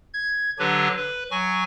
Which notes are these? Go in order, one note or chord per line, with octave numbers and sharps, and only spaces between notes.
G#6
D3 F#3 D4 G4 B4
B4
F#3 G#5 C#6